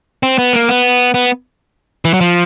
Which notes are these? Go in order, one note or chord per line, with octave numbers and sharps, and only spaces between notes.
C4
B3
A#3
B3
B3
E3
F#3
F3